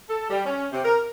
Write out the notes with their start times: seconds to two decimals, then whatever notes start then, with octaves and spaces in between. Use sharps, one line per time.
0.09 A4
0.30 G3
0.45 C#4
0.72 C3
0.84 A#4